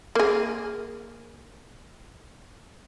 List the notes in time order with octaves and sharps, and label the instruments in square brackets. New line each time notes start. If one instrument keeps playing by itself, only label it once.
[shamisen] A#3 G#4